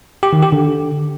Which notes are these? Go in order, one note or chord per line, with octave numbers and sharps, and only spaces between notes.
G4
D#3
G4
D3